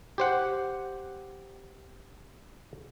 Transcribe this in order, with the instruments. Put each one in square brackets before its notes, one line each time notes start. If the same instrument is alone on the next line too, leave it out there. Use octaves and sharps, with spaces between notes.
[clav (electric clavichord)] G4 C5 F#5